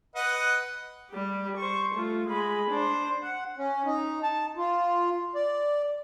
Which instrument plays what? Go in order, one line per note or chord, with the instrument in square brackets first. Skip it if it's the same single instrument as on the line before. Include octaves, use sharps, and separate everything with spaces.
[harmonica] B4 D#5 F#5
[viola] G3 G4
C5 C#6
A3 F4
G#3 B5
D4 C5
[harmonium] F#5
C#4
D#4
A5
F4
D5